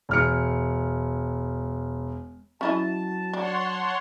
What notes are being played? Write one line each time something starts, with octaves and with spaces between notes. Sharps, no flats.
E1 F6 C#7
F#3 C#4 E4 D#5 A5
D4 C#5 F#5 C6